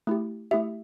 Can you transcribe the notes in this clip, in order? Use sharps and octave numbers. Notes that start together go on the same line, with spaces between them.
A3 E4 G4
A3 E4 G4 E5